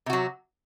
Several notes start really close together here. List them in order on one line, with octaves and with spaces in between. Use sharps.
C3 F#4 F#3